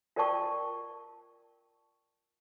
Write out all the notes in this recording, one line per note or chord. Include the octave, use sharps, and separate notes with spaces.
F4 A#4 D5 G5 A5 C#6